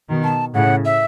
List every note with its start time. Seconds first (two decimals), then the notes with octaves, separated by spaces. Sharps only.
0.09 B2 D#3
0.24 A5
0.54 A2 C#3 F#5
0.85 E5